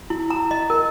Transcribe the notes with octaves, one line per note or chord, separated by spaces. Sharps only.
E4
A#5
D#5
A#4